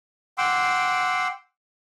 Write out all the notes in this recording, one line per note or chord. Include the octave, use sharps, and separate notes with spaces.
F#5 G5 C6 D6 E6